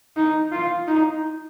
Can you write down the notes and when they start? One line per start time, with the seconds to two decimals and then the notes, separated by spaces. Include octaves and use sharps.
0.17 D#4
0.52 F4
0.88 D#4